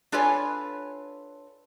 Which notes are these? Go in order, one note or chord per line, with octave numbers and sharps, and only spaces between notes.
D4 F4 A4 B4 C#5 G#5